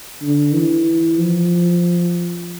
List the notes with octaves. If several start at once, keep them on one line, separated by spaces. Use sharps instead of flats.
D3
E3
F3